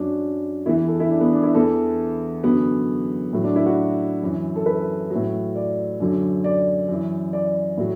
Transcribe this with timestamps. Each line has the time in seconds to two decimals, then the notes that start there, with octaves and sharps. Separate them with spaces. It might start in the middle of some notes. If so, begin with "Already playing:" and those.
Already playing: F#2 F#3 D4
0.66 E2 E4
0.69 E3
0.88 A4
1.00 E4
1.10 D4
1.21 B3
1.33 D4
1.43 E4
1.55 E2 E3 A4
2.44 F#2 D3 F#3 B3
3.33 A2 F#3
3.44 D4
3.56 E4
3.66 F#4
4.23 F#2 E3
4.56 A4
4.66 B4
5.10 F#3
5.15 A2
5.56 D5
6.00 F#2 D3 F#3
6.44 D5
6.89 F#2 E3
7.33 D5
7.77 A2 F#3